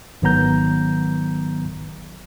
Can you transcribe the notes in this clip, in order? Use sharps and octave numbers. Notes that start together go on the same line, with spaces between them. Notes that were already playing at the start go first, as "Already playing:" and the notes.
G#1 D#3 F#3 B3 A#5 G6